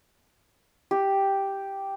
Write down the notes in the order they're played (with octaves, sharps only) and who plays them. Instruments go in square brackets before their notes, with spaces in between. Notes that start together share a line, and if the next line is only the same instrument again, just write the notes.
[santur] G4